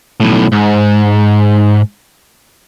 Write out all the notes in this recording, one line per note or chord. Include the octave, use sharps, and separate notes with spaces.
B1 A2
G#2